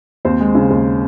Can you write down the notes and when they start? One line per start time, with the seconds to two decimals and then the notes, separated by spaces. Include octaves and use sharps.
0.25 D#2 C4 C5
0.40 G#3
0.55 C#3
0.70 D#2